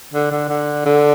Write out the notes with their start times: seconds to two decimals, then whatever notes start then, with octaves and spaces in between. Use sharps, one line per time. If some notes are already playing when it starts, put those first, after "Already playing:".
0.13 D3
0.31 D3
0.49 D3
0.85 D3